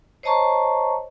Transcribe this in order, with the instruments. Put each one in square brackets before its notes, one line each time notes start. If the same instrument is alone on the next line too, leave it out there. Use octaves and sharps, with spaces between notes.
[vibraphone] C5 C#5 D#5 A5 A#5 C#6